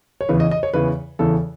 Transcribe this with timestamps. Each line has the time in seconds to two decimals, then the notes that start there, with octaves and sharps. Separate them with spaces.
0.21 C#5
0.29 E2 C#3 E3 B4
0.40 D#5
0.51 D#5
0.63 C#5
0.74 E2 C#3 E3 B4
1.19 E2 C#3 E3 A4